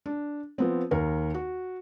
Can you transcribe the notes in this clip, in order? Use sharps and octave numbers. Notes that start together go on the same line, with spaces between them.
D4
F3 B3 C4
D#2 A#4
F#4